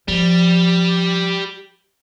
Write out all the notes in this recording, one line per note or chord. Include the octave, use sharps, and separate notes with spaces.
F3 G3